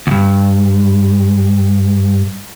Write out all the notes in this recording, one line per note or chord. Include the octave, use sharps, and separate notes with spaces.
D2 G2